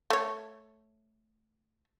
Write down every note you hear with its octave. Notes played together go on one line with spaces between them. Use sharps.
A3 C#5